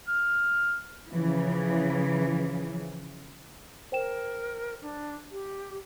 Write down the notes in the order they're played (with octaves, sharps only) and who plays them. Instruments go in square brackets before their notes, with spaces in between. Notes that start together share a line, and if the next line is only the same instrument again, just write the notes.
[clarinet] F6
[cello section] C#3 E3 F3
[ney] A#4 [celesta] C5 G5 E7
[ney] D4
G4